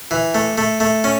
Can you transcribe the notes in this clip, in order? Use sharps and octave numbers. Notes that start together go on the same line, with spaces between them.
E3
A3
A3
A3
C#4